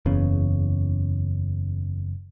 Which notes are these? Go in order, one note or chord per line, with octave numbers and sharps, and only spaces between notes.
F#1 E2 C#3